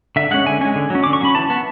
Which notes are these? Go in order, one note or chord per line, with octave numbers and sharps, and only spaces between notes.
D3 E5
G#3 C#4 F#5
D3 G#5
G#3 C#4 G#5
D3
F#3 C#4
D3 D6
C#6
F#3 C#4 B5
E3 A5
B3